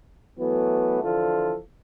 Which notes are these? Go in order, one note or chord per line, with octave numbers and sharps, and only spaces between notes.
E3 F#3 A3 B3
D3 E3 F3 F4 A4